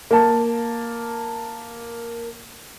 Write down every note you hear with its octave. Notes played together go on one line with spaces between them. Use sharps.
A#3 A5